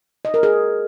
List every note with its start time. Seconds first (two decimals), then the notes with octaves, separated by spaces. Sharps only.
0.25 D#5
0.34 A#4
0.43 G#4